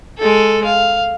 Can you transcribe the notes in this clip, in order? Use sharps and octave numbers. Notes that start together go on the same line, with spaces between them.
G#3 A4
F5